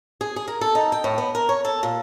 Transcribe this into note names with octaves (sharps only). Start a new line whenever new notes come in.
G#4
G#4
A#4
A4
D#4
G5
A2
B3
A#4
C#5
A4
A#2